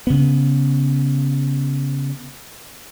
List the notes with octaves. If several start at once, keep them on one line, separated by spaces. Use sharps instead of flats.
C#3 B3